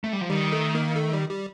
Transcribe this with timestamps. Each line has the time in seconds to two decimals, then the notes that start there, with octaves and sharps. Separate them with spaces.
0.04 A3
0.13 G3
0.21 F3
0.30 D#3 G3
0.52 A3
0.75 A#3
0.96 A3
1.13 G3
1.29 G3